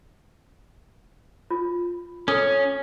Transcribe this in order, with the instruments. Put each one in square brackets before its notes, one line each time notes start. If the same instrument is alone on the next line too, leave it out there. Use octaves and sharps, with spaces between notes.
[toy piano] F4
[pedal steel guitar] C#4 [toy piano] A4 D#6